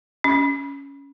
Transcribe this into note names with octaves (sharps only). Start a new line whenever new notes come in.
C#4